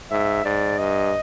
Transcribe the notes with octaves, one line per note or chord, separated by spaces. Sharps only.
G#2 E5
G#2 D5
G2 D#5